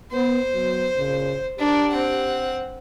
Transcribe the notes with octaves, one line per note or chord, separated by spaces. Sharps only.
B3 C5
F#3 B3
A#2 C#3
D4 G4 A#4
C4 F#5